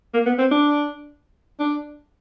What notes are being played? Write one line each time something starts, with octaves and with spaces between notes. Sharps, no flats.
A#3
B3
C4
D4
D4